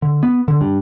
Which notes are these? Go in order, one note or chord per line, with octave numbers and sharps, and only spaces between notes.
D3
B3
D3
G2